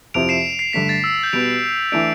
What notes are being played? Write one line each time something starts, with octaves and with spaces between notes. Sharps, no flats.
F2 C3 F3 C4 E4 D7 F7
C7 E7
C7
G2 D3 A3 B6
A6
E6
G6
B2 G3 B3 D7 F7
E3 A3 D4 D7 F7